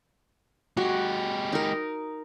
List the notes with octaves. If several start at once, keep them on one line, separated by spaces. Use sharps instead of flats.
G#3 F#4 G4
D#4 A#4